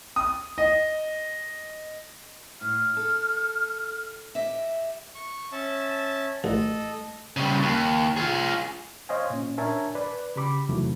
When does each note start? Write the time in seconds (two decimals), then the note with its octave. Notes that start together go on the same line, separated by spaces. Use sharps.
0.16 D#6
0.58 D#5
2.61 A2 F6
2.97 A4
4.35 G4 D#5 E5
5.15 C#6
5.52 C#4 E5 A5
6.44 A1 A4 D#5
7.37 C#3 G3
7.63 D#2
8.17 F4 G#4
9.09 C5 C#5 D#5 F5 G#5
9.30 A#2 C#4
9.58 D4 A#4 C#5 E5 G#5 A5
9.95 B4 D5
10.36 C#3 G4 B5 D6
10.69 E2 C3 D#3 E3 F#3 A3